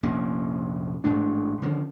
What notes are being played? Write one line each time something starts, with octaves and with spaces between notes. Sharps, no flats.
F1 A#1 A#3 C#4
A1 G#2 A3 D4
D3 D#3 F3 C#4